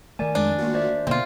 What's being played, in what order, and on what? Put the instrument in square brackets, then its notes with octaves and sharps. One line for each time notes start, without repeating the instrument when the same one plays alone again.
[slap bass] D#3 A3 [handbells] A#4 D5 G#5
[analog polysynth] F2 G#3 A6 [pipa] D4
[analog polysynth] A#3 F4 F#4
[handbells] C5 D5 E5
[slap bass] B2 D3 [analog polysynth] A#3 [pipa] C4 F4